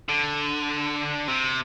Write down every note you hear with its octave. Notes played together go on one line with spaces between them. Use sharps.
D3
C3